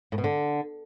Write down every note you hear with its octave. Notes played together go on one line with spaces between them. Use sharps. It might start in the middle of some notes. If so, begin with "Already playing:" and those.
A2
B2
D3